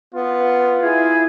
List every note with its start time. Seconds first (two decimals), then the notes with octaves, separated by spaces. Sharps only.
0.14 B3 F4
0.82 E4 G#4 G#5 G#6